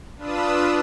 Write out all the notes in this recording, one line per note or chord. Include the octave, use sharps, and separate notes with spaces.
D4 F4 B4 D#6 E6